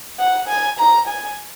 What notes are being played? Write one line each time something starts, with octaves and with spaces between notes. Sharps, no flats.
F#5
G#5
A#5
G#5